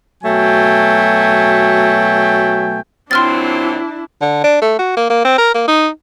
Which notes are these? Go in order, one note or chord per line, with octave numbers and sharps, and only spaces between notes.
B2 F#3 A3 G5 G#5
A#2 F#3 C4 D4 E4 C6 F6 A6
D3
D4
A3
F#4
A#3
A#3
C4
A#4
A#3
D#4